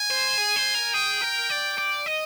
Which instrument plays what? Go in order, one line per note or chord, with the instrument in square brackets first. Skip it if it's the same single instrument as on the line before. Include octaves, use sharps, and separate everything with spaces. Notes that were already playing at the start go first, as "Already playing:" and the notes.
Already playing: [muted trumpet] G#5
[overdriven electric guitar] C5
G#4
C5
A#4
[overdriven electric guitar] G#4 [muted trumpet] G5
[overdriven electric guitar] A#4
D5
D5
D#5